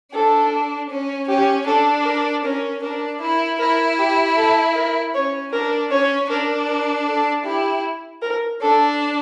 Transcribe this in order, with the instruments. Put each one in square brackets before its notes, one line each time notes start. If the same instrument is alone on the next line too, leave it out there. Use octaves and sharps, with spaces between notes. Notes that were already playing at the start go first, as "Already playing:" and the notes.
[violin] D4 [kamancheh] A4
[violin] C#4
[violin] C#4 [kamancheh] G4
[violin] D4 [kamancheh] A4
[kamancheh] A#4
[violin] C#4 [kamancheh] A#4
[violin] D4 [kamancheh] A#4
[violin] E4 [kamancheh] A#4
[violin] E4 [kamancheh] A#4
[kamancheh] G4
A4
A#4
[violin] C#4 [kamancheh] C#5
[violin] D4 [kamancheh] A#4
[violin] C#4 [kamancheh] C#5
[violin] D4 [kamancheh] A#4
[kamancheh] A#4
A4
[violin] E4 [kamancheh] G4
[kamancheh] A#4
[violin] D4 [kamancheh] A4